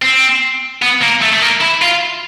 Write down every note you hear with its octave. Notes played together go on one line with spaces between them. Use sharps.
C4
B3
A#3
A3
A3
A#3
E4
F4